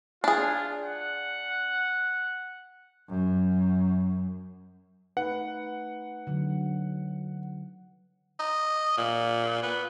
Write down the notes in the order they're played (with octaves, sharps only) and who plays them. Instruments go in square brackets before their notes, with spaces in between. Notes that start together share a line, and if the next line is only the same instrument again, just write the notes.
[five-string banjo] D4 G#4 [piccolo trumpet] F4
[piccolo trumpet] F#5
[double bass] F#2
[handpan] A3 D#4 B4 [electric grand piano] F#5
[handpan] D3 F#3
[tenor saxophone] D#5
A#2
B3